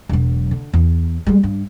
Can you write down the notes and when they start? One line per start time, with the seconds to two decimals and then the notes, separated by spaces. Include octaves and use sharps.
0.09 E1 F#3
0.51 D3
0.74 E2
1.27 G3 G#3
1.43 G2